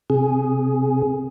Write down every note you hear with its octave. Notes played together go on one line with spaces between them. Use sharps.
C3 G#4